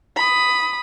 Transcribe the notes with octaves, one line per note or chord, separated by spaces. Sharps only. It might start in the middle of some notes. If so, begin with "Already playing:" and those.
B5 D#6